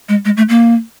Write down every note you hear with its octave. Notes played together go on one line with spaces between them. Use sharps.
G#3
G#3
A3
A#3